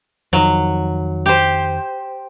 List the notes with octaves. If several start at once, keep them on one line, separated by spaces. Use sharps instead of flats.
F2 D#3 F#3
G4 C5